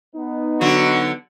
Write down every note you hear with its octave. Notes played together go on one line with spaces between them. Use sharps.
B3 D#4
D3 F#3 F#4